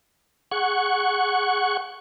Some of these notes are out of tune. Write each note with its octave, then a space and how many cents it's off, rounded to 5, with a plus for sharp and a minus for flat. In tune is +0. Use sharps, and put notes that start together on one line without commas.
G#4 +0 F#5 +0 C#6 +0